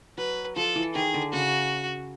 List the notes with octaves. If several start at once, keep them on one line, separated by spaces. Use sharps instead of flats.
F#3 B4
F3 A4
E3
D#3 G#4
D3
C#3 F#4